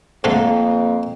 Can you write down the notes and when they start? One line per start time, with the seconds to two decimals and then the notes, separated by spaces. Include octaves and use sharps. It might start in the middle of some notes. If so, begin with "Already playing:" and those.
0.24 F2 G#2 D3 A3 A#3